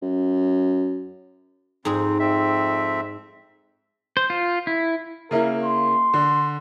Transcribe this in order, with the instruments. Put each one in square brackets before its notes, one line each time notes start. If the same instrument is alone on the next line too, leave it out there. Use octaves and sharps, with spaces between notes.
[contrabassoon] F#2
[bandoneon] F2 C4 [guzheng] G#2 G#4
[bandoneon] F2 C4 E5
[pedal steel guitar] C5
F4
E4
[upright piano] C#3 A#3 E4 [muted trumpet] A#4
[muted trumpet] C6
[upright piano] D3